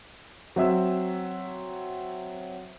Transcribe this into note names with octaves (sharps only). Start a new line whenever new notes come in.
F#3 C4 E5 E6